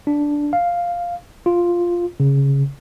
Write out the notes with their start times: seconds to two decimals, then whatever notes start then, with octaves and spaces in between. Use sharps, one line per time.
0.07 D4
0.53 F5
1.46 F4
2.20 C#3